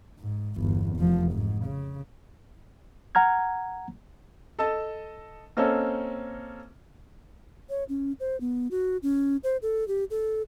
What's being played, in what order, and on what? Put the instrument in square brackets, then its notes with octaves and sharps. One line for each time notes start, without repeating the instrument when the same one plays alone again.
[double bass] G#2
G1 E2
F1 F3
G#2
C#3
[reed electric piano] F#5 A#5 F6 G#6
[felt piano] A4 D#5 A5
A#3 C4 C#4 A4 D#5
[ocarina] C#5
C#4
C5
B3
F#4
C#4
C5
A4
G4
A4